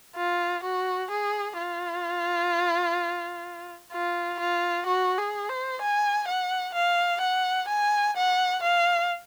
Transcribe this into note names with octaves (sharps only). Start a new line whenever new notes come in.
F4
F#4
G#4
F4
F4
F4
F#4
G#4
C5
G#5
F#5
F5
F#5
G#5
F#5
F5